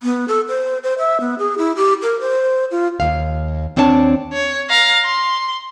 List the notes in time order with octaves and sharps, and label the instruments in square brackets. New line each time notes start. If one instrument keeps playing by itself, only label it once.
[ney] B3
A4
C5
C5
E5
B3
G#4
E4
G4
A#4
C5
F4
[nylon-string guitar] D#2 F5
D#2 C4 D4 C#5 F#5 A5
[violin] C#5
F5 A#5
C6